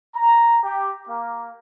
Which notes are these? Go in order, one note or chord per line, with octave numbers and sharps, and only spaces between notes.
A#5
G4
A#3